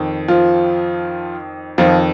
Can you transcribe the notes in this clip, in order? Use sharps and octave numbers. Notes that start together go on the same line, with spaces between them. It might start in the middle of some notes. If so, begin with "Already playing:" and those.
Already playing: F2 D#3
F3 F4
F2 D#3 F3 F4